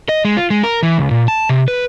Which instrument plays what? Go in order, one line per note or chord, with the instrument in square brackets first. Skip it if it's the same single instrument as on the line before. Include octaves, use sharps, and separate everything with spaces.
[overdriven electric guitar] D#5
G#3
F4
G#3
A#4
E3
C#2
A#2
A5
C3
B4